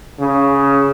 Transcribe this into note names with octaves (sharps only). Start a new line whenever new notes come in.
C#3